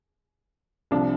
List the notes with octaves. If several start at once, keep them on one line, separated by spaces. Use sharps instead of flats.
C2 C3 F3 D4